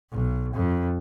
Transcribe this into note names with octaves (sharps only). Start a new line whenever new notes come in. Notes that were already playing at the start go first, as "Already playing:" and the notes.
B1
F2